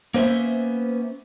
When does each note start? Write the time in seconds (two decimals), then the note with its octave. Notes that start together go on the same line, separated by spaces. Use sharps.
0.14 A#3 B3 C#4 C5 E5